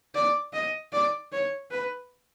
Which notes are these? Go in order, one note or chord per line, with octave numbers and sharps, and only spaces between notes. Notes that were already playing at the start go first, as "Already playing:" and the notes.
D5
D#5
D5
C#5
B4